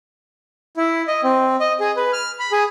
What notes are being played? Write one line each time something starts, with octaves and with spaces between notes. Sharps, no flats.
E4
D#5
C4
D#5
G#4
B4
F6
B5
G#4